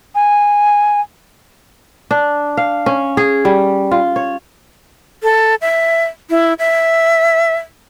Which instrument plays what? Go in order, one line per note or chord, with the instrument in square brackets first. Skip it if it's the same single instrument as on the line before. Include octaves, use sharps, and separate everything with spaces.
[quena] G#5
[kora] D4
F5
C#4
G#4
G3
F4
C#5
[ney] A4
E5
E4
E5